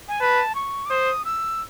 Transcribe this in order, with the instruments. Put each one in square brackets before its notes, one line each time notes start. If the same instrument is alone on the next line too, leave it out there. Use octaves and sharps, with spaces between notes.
[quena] G#5
[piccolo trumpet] B4 [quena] A5
[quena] C#6
D6
[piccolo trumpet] C5 [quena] D#6
[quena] E6